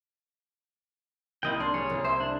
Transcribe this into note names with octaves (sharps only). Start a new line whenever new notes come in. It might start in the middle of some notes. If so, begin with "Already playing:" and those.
C2 A#3 E4 D#5 G5
D4 C6
G3 G#4 C#5
C2
C5 E5 G#6
D4